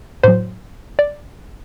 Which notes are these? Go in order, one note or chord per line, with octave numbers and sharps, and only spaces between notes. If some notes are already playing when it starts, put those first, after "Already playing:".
A2 F#3 C5
D5